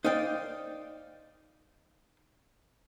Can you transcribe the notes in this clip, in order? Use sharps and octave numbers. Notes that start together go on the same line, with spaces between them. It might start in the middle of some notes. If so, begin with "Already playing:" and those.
D#4 C5 D5 F5 G5